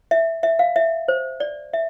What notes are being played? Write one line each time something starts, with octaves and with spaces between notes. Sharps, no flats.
E5
E5
F5
E5
C5
D5
E5